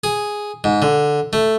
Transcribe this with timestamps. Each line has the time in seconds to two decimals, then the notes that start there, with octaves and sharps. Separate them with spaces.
0.04 G#4
0.64 G#2
0.82 D3
1.33 A3